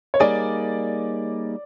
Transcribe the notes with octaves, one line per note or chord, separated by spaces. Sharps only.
C#5
G3 A#3 D#4 G#4 D5